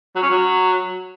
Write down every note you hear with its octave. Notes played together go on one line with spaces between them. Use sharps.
F#3
C#4
F#3